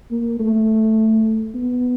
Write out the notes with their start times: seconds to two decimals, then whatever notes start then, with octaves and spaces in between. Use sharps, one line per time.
0.11 A#3
0.39 A3
1.55 B3